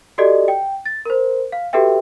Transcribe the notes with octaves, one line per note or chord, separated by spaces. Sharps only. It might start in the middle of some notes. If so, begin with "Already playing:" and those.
F#4 G4 A4 D5 D#5
G5
A6
A#4 C5
F5
F#4 G4 A4 B4 E5 G5